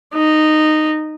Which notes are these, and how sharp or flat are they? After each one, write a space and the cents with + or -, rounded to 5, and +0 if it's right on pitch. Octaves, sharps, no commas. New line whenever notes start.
D#4 -10